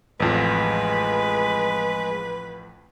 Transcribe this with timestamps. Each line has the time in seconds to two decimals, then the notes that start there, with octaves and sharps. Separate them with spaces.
0.20 A1 F2 F3 G#3 B4